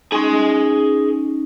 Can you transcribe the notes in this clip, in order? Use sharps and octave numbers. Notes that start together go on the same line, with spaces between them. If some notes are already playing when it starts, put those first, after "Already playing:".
C#4 D#4 G#4 C6